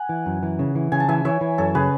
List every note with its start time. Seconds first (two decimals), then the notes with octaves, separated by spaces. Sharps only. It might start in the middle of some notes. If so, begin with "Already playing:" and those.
Already playing: F#5 G#5
0.09 E3
0.26 F#2
0.43 E3
0.59 C#3
0.75 E3
0.92 C#3 G#5
1.00 A5
1.08 E3 E5 G#5
1.25 E3 C#5 E5
1.41 E3
1.58 F#2 A4 C#5
1.75 C#3 G#4 B4